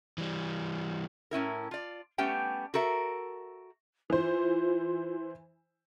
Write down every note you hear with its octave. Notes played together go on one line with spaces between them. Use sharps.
E3 G3
A2 C#4 E4 A#4
F4 D5
G3 A3 B3 C#4 G4 G5
F#4 A4 A#4 E5
E3 F4 C5